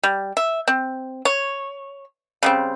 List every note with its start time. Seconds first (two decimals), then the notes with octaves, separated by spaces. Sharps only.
0.03 G3
0.37 E5
0.68 C4
1.25 C#5
2.43 C#3 G3 C4